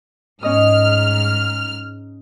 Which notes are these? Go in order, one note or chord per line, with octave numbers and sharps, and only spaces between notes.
G#2 C#4 D#5 D#6 F6